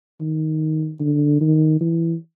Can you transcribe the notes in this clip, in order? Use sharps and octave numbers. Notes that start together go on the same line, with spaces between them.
D#3
D3
D#3
E3